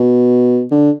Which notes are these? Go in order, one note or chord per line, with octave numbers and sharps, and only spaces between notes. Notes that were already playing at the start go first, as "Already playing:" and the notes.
Already playing: B2
D3